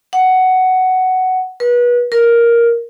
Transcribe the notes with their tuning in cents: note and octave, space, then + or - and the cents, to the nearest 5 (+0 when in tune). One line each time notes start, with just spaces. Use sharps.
F#5 +10
B4 -30
A#4 +5